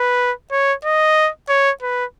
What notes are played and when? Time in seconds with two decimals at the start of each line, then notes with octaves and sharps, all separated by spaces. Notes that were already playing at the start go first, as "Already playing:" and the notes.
Already playing: B4
0.52 C#5
0.85 D#5
1.49 C#5
1.82 B4